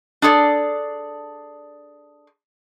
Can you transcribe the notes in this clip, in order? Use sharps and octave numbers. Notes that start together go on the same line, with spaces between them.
D4 G#4 A4 D5